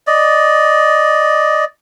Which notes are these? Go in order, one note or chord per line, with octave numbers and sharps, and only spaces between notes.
D5 D#5